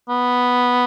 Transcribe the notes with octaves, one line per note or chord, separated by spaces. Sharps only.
B3